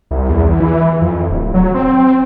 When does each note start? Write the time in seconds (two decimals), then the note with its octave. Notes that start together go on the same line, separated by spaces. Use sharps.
0.11 C2
0.30 E2
0.60 E3
1.01 F2
1.30 D1
1.54 F#3
1.74 C4